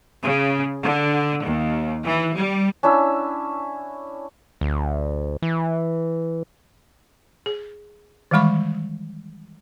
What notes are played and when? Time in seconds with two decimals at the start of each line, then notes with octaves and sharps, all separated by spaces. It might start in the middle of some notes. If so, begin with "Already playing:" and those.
0.23 C#3
0.82 D3
1.45 D#2
2.04 E3
2.34 G3
2.83 C#4 D4 E4 E6
4.61 D2
5.42 E3
7.46 G#4
8.31 D#3 E3 G3 G#3 B5 C#6